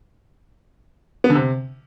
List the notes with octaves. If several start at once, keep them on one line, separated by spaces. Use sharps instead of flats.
B3
D3
C3